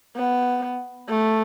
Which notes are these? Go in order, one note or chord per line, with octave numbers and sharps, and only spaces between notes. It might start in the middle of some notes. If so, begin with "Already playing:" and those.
B3
A3